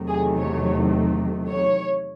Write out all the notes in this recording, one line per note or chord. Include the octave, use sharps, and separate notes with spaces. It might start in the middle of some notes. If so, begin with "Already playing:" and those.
Already playing: E2 C3 D#3 F#3 A3
G#4
C#5
C#5